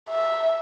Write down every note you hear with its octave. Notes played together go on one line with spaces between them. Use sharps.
E5